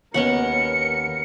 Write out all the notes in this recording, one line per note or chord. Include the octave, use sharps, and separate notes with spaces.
D#2 B3 C#4 A#4 F#5 C#7